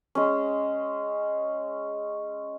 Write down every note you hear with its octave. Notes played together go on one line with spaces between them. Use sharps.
G#3 C#4